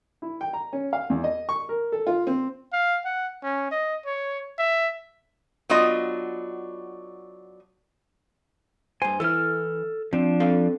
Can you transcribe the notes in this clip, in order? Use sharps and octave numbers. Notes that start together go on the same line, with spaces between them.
E4
G5
A#5
C#4
F5
E2
D#5
C#6
A#4
A4
F4
C4
F5
F#5
C#4
D#5
C#5
E5
F#3 B3 D4 F4 D#5
G2 C5 G#5
E3 E4 A4 F6
F3 C4 D4
C4 A4 F5